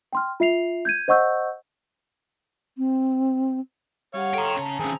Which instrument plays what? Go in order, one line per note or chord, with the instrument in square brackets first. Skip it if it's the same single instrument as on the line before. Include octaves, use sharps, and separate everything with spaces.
[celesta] G5 C6 F6
F4 E5 C7 F7
G6 G#6 D#7
C5 D#5 F#5 C#6 E6 G6
[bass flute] C4
[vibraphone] G3 G4 F#5 [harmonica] C#5 F5
[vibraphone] A4 C6 [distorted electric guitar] G5 A#5
[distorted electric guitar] C#3 [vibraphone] A5 A#5
[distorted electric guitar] D#3 C#4 [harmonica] C4 G#4